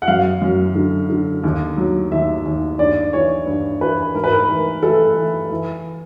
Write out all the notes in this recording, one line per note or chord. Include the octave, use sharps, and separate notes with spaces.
F#5
F#2 F5
F#2
D3
D3
D#2
F#3
D#2 E5
D#2
G2 D5
E3 C#5
G2
E3 B4
G#2 A#4
B4
A#4
E3
E3 A4
E3
E3